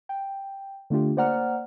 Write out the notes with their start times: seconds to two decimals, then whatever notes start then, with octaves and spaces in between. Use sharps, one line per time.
0.09 G5
0.90 D3 A3 D4 F4 G4
1.16 A#3 C5 D5 F#5 A#5 F6